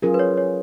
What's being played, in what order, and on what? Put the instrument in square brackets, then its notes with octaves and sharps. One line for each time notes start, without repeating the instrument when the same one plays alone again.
[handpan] F#3 C#4 F4 G#4 [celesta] A#4
[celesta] B4
C#5
C#5